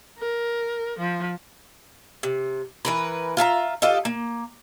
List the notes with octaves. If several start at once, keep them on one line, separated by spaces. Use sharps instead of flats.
A#4
F3
C3
E3 A#4 B4
F4 E5 A5 A#5
F4 G4 A4 D#5
A#3